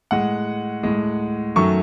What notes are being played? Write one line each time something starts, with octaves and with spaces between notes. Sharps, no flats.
A2 G#3 F#5
A2 G#3
F#2 D#3 F#3 A3 C#6